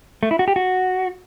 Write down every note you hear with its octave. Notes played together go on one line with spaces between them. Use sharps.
A3
E4
F#4
G4
F#4